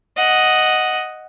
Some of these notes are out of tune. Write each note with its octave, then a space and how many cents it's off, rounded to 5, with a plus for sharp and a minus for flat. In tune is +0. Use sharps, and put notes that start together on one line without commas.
D#5 +0 F#5 +0